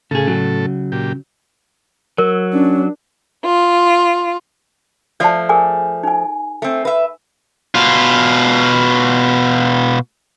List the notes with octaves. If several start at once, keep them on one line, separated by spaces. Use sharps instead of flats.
A2 C#3 G#4 A4
C#3 F#3
A#2 G4
F#3 A#4
C#4 D4
F4
F3 A3 D5 A5
G#4 A#4 G#5
D#4 G#5
A3 C4
B4 E5
B2 F4